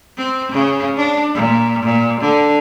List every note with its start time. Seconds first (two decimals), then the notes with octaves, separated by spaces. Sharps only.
0.17 C4
0.52 C#3
0.96 D4
1.34 A#2
1.83 A#2
2.21 D3